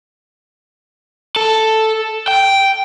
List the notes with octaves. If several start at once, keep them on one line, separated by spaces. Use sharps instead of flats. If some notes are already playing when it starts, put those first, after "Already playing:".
A4
G5